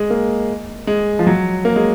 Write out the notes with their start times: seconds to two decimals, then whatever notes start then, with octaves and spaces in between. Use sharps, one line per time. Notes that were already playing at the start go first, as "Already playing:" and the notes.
Already playing: G#3
0.10 A#3
0.87 G#3
1.19 F3
1.27 F#3
1.65 A#3
1.76 G#3